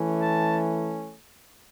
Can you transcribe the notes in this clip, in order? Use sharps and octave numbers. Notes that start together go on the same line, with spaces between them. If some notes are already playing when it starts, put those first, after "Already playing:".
Already playing: E3 A3 C#4
A5